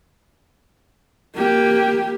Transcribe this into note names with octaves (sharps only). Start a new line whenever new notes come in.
A#3 G4